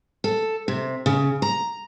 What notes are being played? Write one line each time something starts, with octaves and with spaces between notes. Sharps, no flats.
A4
C3
C#3
A#5